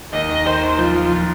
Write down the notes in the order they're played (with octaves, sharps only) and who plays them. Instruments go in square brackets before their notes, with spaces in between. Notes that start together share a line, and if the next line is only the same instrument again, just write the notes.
[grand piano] D#2 [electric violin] D#5
[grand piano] D#3
[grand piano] D#3 [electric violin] C5
[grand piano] D#2
[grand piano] F3 [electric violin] F4
[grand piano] F3
F3